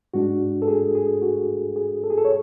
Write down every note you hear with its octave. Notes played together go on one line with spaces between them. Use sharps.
G#2 G#3 D4 F#4
A4
G#4
G#4
F#4
G#4
A4
G#4
A4
C#5